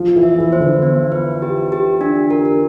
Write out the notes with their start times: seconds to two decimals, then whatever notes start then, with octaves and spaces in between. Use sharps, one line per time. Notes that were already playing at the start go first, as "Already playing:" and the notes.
Already playing: F3
0.16 E3
0.23 E5
0.38 E3
0.53 C5
0.60 D3
0.82 B3
1.12 B4
1.42 G4
1.72 G4
2.01 D4
2.31 A#4